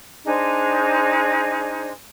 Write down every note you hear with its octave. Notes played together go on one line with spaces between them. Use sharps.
D4 D#4 G#4 C5